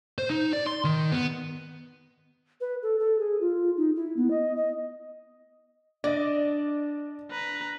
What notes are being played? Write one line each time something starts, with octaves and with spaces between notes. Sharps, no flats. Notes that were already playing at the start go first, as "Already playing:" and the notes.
C5
D#4
D5
C6
D#3
B3
B4
A4
A4
G#4
F4
D#4
E4
B3
D#5
D#5
D4 D5 D#5
B4 A#5